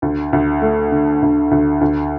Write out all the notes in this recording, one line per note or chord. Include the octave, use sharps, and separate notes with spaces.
D2
D2
A3
D3
D2
D2
D2